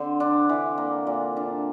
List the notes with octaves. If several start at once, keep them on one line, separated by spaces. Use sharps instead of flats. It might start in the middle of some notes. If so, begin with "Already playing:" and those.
Already playing: D3 C4
D4
E3
A#3
A#2
D4